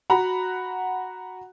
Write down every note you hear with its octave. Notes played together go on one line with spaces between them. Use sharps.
F#4 F#5 A#5 B5 F#6